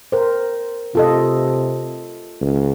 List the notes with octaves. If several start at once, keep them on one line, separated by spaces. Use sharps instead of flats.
A#4 C5
C3 F4 A4 D#5
C#2